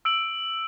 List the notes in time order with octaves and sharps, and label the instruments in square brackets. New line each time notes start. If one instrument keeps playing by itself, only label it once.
[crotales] E6 D7 F#7